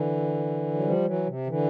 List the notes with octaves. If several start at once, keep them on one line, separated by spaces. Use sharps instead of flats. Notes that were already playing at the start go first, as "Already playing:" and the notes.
Already playing: D3 E3
F#3
F3 G3
E3 F#3
C3
D3 E3